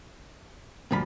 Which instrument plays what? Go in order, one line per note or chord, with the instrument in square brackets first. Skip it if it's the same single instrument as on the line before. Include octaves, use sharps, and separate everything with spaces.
[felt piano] D2 G2 [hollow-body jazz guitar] A#2 F3 B5